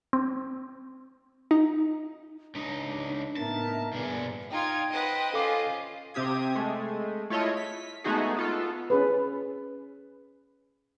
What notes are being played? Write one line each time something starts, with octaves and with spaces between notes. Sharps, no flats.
C4
D#4
C#2 D4 D#4
A2 A#3 B3 D#4 A#4 E5 A5
G1 B2 B3 G#4 D5
D#4 F4 G5 G#6
B4 C5 D#5 F#5
C#4 F4 A4 F5 D6
C3 C4 G4 D#6 G#6
G#3 A3
A3 E4 F4 C#5 D#5
B6
G#3 A3 B3 D#4 F#4 G#4
B3 F4 A4
C#4 G#4 B4